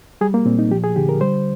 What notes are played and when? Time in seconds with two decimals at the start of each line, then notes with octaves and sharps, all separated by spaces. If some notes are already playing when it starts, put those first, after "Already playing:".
0.21 G3 G#4
0.34 A#3
0.46 A#2 C4
0.59 D#4
0.71 F3 G4
0.84 G#4
0.96 D3 G4
1.09 A#4
1.21 G3 C5